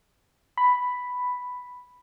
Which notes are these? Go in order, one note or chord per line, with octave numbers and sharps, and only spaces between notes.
B5